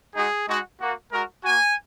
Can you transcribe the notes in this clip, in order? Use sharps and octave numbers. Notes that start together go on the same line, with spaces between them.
G#3 D#4 F#4 G#4
G#3 D#4 F#4
A#3 F#4
G#3 F#4 A#4
A#3 F#4 G#5